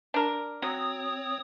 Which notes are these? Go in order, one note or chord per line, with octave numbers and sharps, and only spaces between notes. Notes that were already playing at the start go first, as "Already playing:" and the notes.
D4 A#4
F#3 C4 C#5 D#6